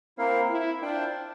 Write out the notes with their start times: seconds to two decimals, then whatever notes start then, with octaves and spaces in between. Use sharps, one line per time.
0.18 A#3 C4 E4 A#4 F5
0.49 E4
0.82 D4 F4 C5 G5